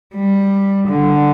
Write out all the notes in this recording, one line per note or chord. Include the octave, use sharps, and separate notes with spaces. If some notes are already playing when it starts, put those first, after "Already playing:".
G3
D3